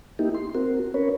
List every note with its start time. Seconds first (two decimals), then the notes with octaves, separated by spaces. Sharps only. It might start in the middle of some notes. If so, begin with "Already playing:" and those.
0.19 A#3 D#4 E4 G4
0.35 C6
0.55 C4 F#4 A#4
0.94 C#4 A#4 B4 C#5